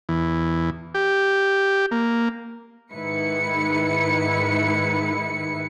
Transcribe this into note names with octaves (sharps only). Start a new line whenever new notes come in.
E2
G4
A#3
G#2 D#3 E4 B4 C#7